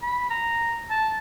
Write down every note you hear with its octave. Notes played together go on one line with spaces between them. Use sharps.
B5
A#5
A5